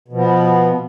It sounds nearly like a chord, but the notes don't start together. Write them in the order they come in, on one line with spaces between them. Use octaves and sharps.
B2 F3 B3